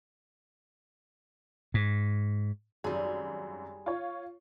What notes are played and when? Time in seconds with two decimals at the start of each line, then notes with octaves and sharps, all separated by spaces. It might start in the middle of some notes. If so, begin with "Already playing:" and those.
1.74 G#2
2.84 G#1 F#2 G3 G#4
3.86 F4 C#5